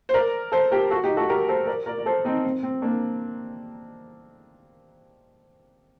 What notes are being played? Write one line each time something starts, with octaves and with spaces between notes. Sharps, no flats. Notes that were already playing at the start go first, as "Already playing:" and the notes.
C5
A#4 D5
A4 C5
G4 A#4
F#4 A4
D#4 G4
F#4 A4
G4 A#4
A4 C5
A#4 D5
A#4 D5
D5
A4 C5
C4 D#4
C4
C4
A#3 D4